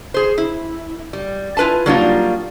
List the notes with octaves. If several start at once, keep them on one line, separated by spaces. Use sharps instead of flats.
G#4 C5
E4
G3
E4 F4 B4 G#5 A5
F#3 G3 A#3 D4 D#4 F4